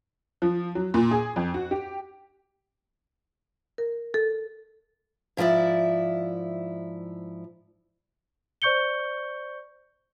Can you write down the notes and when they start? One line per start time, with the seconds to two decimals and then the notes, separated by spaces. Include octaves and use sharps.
0.42 F3
0.75 F#3
0.94 A#2
1.11 G#4
1.36 F2
1.54 F#4
1.71 G4
3.78 A#4
4.14 A4
5.37 G#2 F3 E4 D5 E5
8.62 C5 D5 C#6 G6 C#7 G7